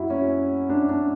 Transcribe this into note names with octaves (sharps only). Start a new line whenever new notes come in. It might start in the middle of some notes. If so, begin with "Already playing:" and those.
Already playing: F#2 F#3 E4 F#4
C#4
D4
D4